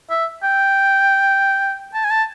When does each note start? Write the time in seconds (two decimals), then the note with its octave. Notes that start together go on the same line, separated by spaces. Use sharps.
0.10 E5
0.43 G5
1.93 A5
2.04 G#5
2.10 A5